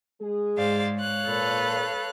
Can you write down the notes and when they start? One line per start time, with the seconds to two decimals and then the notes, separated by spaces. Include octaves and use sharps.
0.21 G#3 G#4
0.57 G#2 C5 D5 F5
0.98 C#5 F5 F#6
1.27 A#2 A4 B4